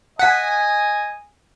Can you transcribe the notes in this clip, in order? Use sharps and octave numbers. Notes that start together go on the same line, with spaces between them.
D#5 F#5 G#5 B6